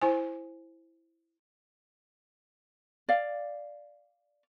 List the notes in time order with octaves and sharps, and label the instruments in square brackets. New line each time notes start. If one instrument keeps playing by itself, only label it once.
[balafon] E4 C5 G#5
[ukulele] D5 F5